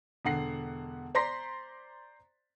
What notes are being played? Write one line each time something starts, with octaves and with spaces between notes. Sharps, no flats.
E1 D3 F#5 C7
C5 D5 A#5 C6 A#6 B6